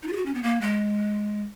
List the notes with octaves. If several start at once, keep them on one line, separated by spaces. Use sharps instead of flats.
D#4
F4
G#4
F#4
C#4
B3
A#3
G#3